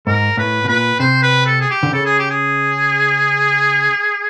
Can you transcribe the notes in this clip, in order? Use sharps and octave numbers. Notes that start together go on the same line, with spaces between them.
G#2 A#4
A2 B4
B2
A#2 B4
C3 C5
B4
A4
G#4
G4
D3
C#3 A4
G#4
G4
G#4